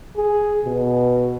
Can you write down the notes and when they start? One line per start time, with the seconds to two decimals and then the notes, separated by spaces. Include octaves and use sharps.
0.17 G#4
0.65 B2